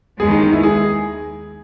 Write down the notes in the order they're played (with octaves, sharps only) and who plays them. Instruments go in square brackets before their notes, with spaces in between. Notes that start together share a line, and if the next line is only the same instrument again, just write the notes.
[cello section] D#2 D#3 G#3 B3 [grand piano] G#4
[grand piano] D#4
D#4
E4
G#4